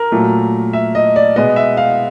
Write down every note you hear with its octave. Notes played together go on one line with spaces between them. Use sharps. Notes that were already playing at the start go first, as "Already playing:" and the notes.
Already playing: A#4
A#2 F#3 A3
E5
D#5
D5
B2 G#3 B3 D#5
E5
F5